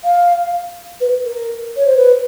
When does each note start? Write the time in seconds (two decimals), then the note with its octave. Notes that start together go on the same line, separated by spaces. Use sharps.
0.04 F5
1.00 B4
1.25 A#4
1.76 C#5
1.86 C5
1.96 B4